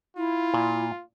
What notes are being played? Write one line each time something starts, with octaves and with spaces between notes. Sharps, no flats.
E4 F4
A#2